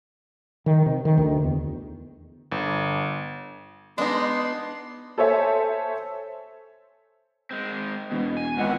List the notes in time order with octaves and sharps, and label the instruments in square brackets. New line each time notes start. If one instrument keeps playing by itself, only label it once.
[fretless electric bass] D#3
C3
D#3
D2
E2
[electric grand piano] G1
[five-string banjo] G#3 D#4 [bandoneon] B3 [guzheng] D4 [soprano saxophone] C6
[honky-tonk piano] A4 C5 C#5 E5 G#5 A5
[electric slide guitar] G#3 C4
[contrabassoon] E1 [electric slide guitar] B2
[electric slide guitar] G#5
[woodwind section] C#2 F#5 [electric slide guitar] D#3 C4 E4